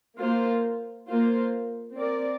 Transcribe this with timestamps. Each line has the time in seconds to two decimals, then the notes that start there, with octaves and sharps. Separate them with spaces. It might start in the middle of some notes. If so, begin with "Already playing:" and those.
0.18 A#3 F4 C5
1.07 A#3 F4 C5
1.95 C4 A#4 D5